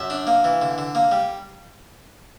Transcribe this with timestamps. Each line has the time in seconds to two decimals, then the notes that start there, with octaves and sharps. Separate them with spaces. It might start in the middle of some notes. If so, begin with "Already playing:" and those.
Already playing: F#2 E5
0.10 D4
0.27 A#3
0.44 E3
0.62 D3
0.78 D3
0.95 A#3
1.11 G3